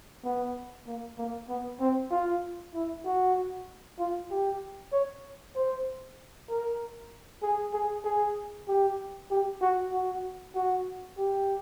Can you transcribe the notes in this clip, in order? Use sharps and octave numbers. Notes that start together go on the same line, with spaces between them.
B3
A#3
A#3
B3
C4
F4
E4
F#4
F4
G4
C#5
C5
A#4
G#4
G#4
G#4
G4
G4
F#4
F#4
F#4
G4